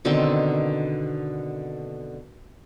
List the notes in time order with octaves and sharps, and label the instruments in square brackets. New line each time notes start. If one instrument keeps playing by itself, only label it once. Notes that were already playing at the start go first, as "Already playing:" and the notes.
[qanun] B2 D3 D#3 C4